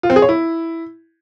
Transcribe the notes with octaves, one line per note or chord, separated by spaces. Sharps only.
F4
C4
G#4
C#5
E4